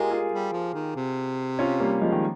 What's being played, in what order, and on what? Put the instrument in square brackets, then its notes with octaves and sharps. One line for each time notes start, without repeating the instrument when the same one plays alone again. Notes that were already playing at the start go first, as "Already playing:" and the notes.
Already playing: [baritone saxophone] G#3 [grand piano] F4 G4 G#4 A#4
[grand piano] F4 G#4
[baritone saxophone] G3
F3
D#3
C3
[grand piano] C#4 F4
G3 A#3
F3 G#3
D#3